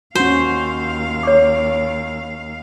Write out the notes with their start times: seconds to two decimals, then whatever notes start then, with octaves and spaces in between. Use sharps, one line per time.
0.15 D#2 C#4 F#4 C5 F5
1.23 C#5 C#6 D6